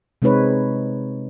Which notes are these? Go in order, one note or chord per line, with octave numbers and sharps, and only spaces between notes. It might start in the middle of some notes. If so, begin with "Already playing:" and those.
C3 G#3 C4 D#4 B4 C#5